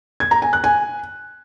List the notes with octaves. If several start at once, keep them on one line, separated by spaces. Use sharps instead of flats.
G#6
A#5
G#5
F#6
G#5